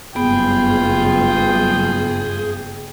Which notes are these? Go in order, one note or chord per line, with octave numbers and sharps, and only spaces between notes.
F#1 G2 B3 F4 G#4 G5